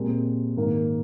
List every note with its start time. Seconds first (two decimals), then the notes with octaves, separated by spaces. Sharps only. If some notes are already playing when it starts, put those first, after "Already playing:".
Already playing: A#2 G#3 C4 G4 A#4
0.56 G#2 D#3 A#3